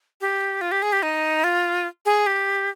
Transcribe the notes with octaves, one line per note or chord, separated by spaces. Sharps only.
G4
F4
G4
G#4
G4
D#4
F4
G#4
G4